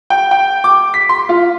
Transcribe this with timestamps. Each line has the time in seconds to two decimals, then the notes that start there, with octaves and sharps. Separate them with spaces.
0.10 G5
0.31 G5
0.64 D6
0.94 B6
1.09 C6
1.29 F4